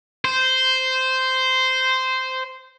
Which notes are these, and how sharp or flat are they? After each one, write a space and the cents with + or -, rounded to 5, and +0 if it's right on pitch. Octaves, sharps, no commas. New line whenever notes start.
C5 -10